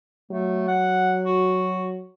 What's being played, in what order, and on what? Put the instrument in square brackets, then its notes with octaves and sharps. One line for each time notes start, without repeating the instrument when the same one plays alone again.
[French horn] F#3 [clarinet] A3
[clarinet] F#5
F#4